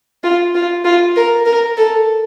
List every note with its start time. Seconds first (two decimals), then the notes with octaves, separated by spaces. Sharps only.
0.24 F4
0.55 F4
0.85 F4
1.16 A#4
1.46 A#4
1.77 A4